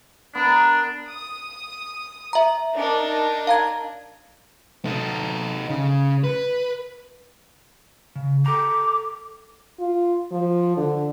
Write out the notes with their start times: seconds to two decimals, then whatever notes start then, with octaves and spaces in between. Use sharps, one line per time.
0.35 B3 D4 A#4
1.08 D#6
2.33 E5 A#5
2.75 D4 D#4 A#4
3.47 F5 A#5 G#6
4.85 D#4 A4
5.69 C#3
6.24 B4
8.16 C#3
8.46 A4 A#5 D6
9.79 F4
10.31 F3
10.77 D3